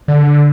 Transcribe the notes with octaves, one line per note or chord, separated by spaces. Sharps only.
D3